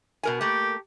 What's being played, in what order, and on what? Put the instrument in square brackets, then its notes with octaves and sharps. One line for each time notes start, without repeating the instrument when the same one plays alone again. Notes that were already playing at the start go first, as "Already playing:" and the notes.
[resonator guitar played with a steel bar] B2 A#4 G#5
[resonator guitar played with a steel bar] A3 A#3 [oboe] G4